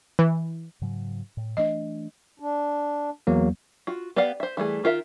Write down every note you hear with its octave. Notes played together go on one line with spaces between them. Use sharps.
E3
G#2 C#3 F#3
A2
E3 A3 D4 D#5
D4
E2 F#3 A#3
F4 F#4
B3 G4 D5 F5 F#5
C5 E5
E3 G3 A3 G#4
D#3 F4 A#4 E5